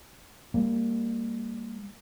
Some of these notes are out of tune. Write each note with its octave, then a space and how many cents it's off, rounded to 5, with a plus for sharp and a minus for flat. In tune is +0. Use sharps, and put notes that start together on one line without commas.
G3 +25 A#3 -10